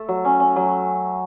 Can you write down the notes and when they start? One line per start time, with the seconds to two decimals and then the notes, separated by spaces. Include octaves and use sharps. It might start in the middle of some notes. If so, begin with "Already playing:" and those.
Already playing: A3 A4
0.09 F#3
0.25 C#4
0.40 C#4
0.56 F#3